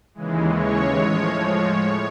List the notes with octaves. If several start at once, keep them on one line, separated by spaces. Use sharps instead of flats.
D#2 C#3 E3 G#3
C#5
A2 F3 G#3
C#5
A2